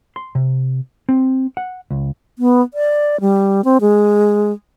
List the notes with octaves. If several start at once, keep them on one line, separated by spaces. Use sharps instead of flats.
C6
C3
C4
F#5
C#2
B3
D5
G3
C4
G#3